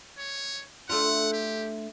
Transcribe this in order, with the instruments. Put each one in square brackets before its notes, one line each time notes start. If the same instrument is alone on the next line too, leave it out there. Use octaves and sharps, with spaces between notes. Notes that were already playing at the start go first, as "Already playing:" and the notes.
[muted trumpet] C#5
[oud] A3 D4 F4 [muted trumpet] F#5
[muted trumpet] G4